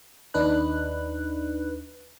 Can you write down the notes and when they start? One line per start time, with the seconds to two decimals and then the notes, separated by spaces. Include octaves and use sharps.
0.34 D#2 D4 D#4 B4 F#6